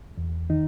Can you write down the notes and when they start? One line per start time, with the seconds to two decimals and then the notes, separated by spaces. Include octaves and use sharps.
0.17 E2
0.50 D#3 D#4